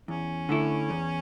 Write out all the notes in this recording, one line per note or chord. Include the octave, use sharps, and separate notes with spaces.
E2 C#4
D3 A3 E4
E2